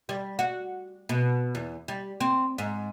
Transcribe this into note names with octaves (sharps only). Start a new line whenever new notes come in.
G3
F#4
B2
E2
G3
C4
G#2